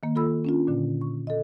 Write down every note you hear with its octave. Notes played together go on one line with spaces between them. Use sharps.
D#3 A#3
F4 A4 B5 E6
C#4 D4 F4
A#2 D3
C#6
A4 D#5